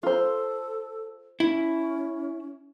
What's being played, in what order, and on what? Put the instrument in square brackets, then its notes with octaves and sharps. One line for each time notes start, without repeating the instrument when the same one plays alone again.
[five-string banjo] F4 C5 [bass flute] A4
[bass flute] C#4 [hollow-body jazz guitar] E4